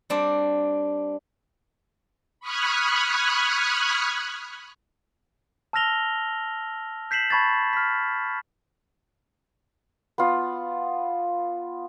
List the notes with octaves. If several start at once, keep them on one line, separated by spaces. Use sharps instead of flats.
G3 C4 D4
B5 C#6 D#6 F6 F#6 G#6
A5 E6 F6 A#6 F7 G7
G6 B6 C7 E7 F#7
A5 B5 C#6 G#6 A6
F6 B6
B3 F4